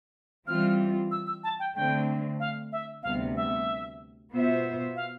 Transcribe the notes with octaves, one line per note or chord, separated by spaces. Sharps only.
E3 G3 C4 F4 F6
E6
E6
A5
G5
D3 A3 C4 G5
F5
E5
D2 C3 G3 B3 F5
E5
B2 B3 F4 C5 E5
F5